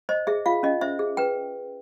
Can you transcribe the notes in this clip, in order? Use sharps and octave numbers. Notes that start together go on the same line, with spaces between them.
C5 D#5
G#4 E5
F4 F5
C#4 D#5
C5 E5
G#4
B4 G5